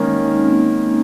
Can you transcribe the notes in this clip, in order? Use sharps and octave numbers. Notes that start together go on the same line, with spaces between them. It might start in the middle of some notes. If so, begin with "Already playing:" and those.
Already playing: D#3 G#3 A#3 C#4
D#4
C#4
C4
A#3